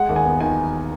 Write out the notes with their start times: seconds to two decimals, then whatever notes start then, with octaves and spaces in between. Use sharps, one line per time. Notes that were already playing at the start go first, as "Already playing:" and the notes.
Already playing: G#3 F#5
0.09 D#2
0.16 G#5
0.25 B3
0.40 D#3 G#5